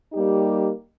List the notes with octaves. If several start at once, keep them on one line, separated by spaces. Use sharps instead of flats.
G3 A#3 D#4 G4